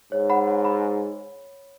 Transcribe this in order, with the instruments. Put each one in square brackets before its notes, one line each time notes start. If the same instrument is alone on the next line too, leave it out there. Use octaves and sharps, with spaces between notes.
[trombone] G#2 [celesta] C#5
[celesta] F#5 B5
C#5
B5